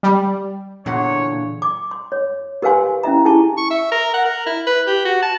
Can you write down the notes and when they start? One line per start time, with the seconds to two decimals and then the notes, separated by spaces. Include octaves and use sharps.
0.03 G3
0.86 E2 A#2 D3 C#5 F#5
1.62 D6
1.91 C6
2.12 C#5
2.62 G4 A#4 B4 F5 G#5 C6
3.03 C#4 E4 E5 A#5
3.25 E4 G4 G#4 G#5 A5 C#6
3.58 C#6
3.71 E5
3.92 A#4
4.14 F#5
4.25 A#4
4.47 E4
4.67 B4
4.87 G4
5.05 F#4
5.22 A5